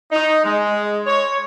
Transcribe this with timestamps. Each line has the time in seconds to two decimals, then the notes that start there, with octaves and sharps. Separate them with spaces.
0.12 D#4
0.44 G#3
1.06 C#5